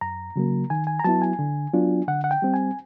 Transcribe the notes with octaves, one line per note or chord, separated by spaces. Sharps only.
F#2 A#5
C#3 F#3 A#3
D#3 G#5
G#5
A#5
F#3 B3 E4 A5
G#5
D3
F#3 B3 D4 F4
D3 F#5
F#5
G5
G3 C4
G#5